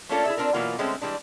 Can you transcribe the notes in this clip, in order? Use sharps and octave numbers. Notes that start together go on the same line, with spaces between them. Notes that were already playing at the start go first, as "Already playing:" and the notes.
A3 A#3 C#4 D4 F4 A4
E4 G#4 E5
C4 D4 F4 A#4
B2 E3 F#3 A#3 F4
D3 G#3 A3 C4 C#4
E3 G3 G#3 D4